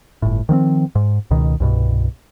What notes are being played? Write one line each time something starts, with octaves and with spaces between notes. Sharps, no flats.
G1 A2
D#3 F3 B3 C4
G#2
C#2 B2 D#3
C2 G2 B2